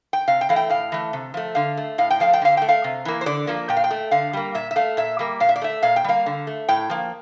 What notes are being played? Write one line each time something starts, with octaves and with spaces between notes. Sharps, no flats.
G5
C3 F5
G5
E3 A3 F5
G5
A2 F5
E3 A3
C3
F3 A3
D3 F5
A3
A2 F5
G5
F3 A3 F5
G5
D3 F5
A3 G5
F5
C3
E3 A#3
C5
D3 D5
F3 A#3
A#2 G5
F5
G5
A3
D3 F5
G3 A#3
A#2 E5
E5
A3 F5
A#2 E5
G3 A#3
A#2 F5
E5
D5
A3 E5
A#2 F5
G5
G3 A#3 F5
D3
A3
A2 G5
F3 A#3